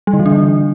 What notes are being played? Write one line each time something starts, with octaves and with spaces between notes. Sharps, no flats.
G3
D3
E3
D4
D3